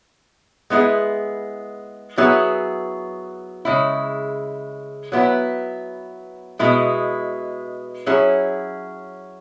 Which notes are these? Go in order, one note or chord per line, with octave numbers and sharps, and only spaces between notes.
G#3 B3 E4 G#4
F#3 B3 E4 G#4
C#3 G#3 E4
F#3 B3 E4
B2 G#3 E4
F#3 C#4 E4 G#4